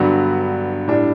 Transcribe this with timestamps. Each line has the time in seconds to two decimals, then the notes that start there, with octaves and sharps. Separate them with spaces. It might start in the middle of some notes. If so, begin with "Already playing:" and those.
Already playing: G2 D3 F#3 B3 F#4
0.87 A2 G3 D4